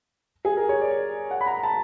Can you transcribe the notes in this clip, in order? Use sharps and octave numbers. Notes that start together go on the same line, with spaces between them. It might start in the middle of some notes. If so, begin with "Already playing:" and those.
G#4
A#4
C#5
D5
F#5
B5
A#5
A5